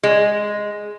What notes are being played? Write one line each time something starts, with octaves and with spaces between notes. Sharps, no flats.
G#3